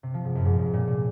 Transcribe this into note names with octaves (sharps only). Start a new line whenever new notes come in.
C3
F3
G#2
F#2
G#2
G#2
A#2
A#2